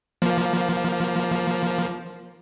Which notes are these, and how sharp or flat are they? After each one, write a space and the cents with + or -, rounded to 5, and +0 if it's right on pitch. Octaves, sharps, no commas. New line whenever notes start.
F3 +0 A#3 +15